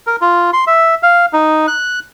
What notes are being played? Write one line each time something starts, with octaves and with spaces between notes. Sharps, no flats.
A#4
F4
C6
E5
F5
D#4
F#6